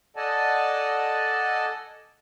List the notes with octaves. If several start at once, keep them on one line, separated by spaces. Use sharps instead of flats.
A4 D5 D#5 F#5 G#5 A5